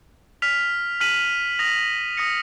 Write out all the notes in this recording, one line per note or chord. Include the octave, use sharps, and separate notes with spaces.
F6 B6 F7
F6 B6 D#7 F#7
D#6 A#6 F7
D#6 A#6 C#7